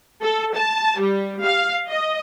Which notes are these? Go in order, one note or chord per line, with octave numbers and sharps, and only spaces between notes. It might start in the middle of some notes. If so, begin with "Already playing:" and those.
A4
A5
G3
F5
D#5